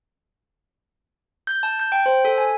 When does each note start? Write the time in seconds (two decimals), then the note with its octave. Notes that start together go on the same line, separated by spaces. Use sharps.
1.47 G6
1.63 A5
1.80 G6
1.92 G5
2.06 C5
2.25 A4
2.38 G#5